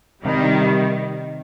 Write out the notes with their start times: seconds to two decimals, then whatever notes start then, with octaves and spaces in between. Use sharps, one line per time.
0.25 C3 D#3 G3
0.44 D#4
0.62 C3